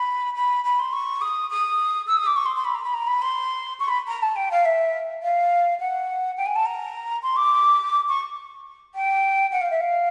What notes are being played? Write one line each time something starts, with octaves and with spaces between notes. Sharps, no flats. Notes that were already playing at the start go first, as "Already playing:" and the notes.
Already playing: B5
B5
B5
C6
C#6
D#6
D#6
E6
D#6
D6
C#6
C6
C6
B5
A#5
B5
A#5
B5
C6
C#6
B5
A#5
A5
G5
F5
E5
F5
F#5
G5
G#5
A5
A#5
C6
D6
C#6
G5
F#5
F5
E5
F5